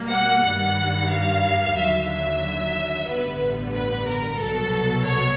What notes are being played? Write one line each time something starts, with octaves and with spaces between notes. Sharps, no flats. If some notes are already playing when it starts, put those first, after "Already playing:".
Already playing: B2 G3 A#3
F#5
G2 D#3 G3 F#5
F5
D#2 D3 F#3 E5
E5
A1 G2 D3 G3 B3 B4
B4
A#4
C2 B2 F#3 A4
C#5